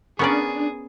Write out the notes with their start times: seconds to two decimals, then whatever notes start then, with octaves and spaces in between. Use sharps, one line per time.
0.19 B3 C#4 D4 G#4 A#4 D5 C#6